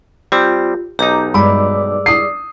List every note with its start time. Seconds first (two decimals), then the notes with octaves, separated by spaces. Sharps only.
0.32 G3 C4 F4 G4
0.99 B1 D#4 G4 A#5 D6
1.34 G2 G#3 D5 B5 D6 E6
2.06 D#6 C7